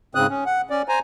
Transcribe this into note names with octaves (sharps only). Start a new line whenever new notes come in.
G#2 C#3 C4 D#6 F#6
C#4
F#5
C#4 D5
C5 G#5 A#5